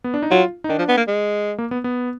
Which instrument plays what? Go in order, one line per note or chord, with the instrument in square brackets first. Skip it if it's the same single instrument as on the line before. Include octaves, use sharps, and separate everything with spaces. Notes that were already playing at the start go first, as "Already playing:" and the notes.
[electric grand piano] B3
D4
D#4
[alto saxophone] F#3 [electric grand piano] F4
[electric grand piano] D#4
[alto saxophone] D#3 [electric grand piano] D4
[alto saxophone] F3
B3
A#3
G#3
[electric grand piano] A#3
B3
B3